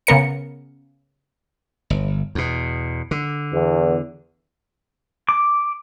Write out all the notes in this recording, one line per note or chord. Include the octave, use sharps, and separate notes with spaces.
C#3 B3 A#4 C#7
G1
E2 B2
D3
E2
D6